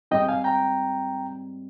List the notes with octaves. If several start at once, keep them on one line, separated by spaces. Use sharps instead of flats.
G#2 G3 C4 D#4 D#5 G5
F5 G#5
G5 A#5